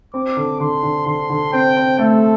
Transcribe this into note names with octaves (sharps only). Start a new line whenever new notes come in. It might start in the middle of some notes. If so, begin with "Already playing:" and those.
C4 D6
D3
D3 C6
D3
D3 C6
D3
C4 G5
C4
A3 A4